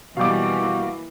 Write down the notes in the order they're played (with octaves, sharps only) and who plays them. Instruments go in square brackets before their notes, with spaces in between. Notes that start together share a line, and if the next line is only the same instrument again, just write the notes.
[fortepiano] B2 G3 [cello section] E3 A#3 [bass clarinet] F#4 [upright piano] F5 D6